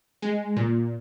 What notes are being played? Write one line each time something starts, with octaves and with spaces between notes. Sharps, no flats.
G#3
A#2